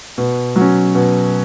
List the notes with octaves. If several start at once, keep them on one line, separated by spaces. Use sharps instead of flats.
B2
F#3
C#4
B2